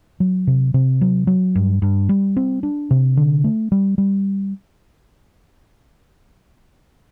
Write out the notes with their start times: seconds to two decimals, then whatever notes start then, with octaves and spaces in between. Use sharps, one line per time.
0.20 F#3
0.47 C3
0.74 C3
1.01 F#3
1.27 F#3
1.55 G2
1.82 G2
2.09 G3
2.37 C4
2.63 D4
2.91 C3
3.17 D3
3.44 A3
3.72 G3
3.98 G3